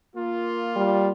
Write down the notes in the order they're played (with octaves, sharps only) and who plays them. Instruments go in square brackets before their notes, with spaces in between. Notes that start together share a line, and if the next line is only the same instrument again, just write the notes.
[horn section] A#3 F4
[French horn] G3